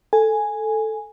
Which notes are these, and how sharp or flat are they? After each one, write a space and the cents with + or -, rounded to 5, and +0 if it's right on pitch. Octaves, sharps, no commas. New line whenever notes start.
A4 +0 G#5 +0